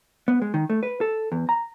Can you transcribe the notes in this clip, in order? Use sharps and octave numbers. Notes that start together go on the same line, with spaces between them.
B3
G#3
D#3
A3
B4
A4
E2
A#5